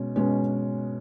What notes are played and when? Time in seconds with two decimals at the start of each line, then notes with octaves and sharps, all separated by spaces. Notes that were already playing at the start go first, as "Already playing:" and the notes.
Already playing: B2 G#3 C#4
0.16 B2 G#3 C#4